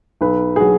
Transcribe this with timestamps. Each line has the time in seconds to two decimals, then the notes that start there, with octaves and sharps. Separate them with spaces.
0.21 B1 B4
0.56 G#4
0.60 F#3 F#4